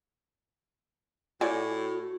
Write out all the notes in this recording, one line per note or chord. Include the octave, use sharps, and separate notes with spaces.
A2 F4 F#4 C#5 D5 G#5